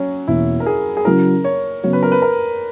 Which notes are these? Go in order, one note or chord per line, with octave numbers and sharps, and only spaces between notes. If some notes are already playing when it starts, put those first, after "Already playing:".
Already playing: F#3 C#4
E2 B2 A#3 E4
A#4
G#4
G#4
C#3 F#3 C#4 E4 A#4
C#5
C#3 F#3 B3 F#4 C#5
B4
A#4
B4
A#4